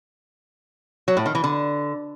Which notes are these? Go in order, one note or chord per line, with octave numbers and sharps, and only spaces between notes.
F#3
A2
D#3
E3
D3